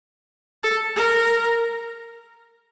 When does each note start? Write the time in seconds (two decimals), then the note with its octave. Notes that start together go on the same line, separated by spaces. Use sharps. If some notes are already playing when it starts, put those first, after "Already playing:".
0.63 A4
0.96 A#4